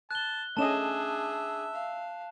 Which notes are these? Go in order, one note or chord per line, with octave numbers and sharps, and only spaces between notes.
A5 F#6 G7
A3 C#4 D4 G#4 D#5 E5 A5 E7
F5